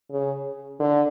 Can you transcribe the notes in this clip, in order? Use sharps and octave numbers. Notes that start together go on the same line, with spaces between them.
C#3
D3